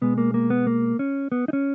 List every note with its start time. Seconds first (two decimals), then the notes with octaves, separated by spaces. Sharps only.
0.02 B2 G#3 B3
0.18 A#3
0.34 A#3
0.50 B3
0.67 A#3
0.99 C#4
1.32 B3
1.48 D#4
1.53 C#4